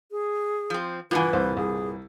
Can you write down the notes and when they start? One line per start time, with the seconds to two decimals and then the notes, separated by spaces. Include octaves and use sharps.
0.11 G#4
0.70 F3 C4
1.11 G2 A#2 E3 F4 B4 F#5 G#5
1.33 C2 C5
1.57 C2 G#4